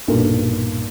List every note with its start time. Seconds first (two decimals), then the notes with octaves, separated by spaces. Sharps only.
0.08 B1 G2 A#2 A4 A#4